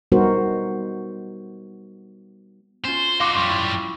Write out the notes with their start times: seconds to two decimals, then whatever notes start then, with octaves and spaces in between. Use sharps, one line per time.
0.12 G3 B3 D#4 F#4 A#4 C5
2.85 C#4 F4 C5
3.20 D#4 F#4 F5 C6 D6
3.35 F#2 G3 C#6 D6
3.50 E4